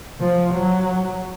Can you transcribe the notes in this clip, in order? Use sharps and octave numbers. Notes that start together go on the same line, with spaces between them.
F3
F#3